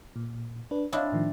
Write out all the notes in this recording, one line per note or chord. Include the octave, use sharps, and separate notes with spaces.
A#2
D4 B4
C4 D4 E4 C#5 D#5 F5
A2 D#3 F3